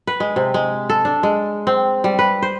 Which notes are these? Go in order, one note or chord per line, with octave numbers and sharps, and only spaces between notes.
B4
G#3
C3
G#3
A4
D4
G#3
C4
G3
B4
C5